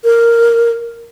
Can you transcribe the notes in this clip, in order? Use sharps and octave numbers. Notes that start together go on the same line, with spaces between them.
A#4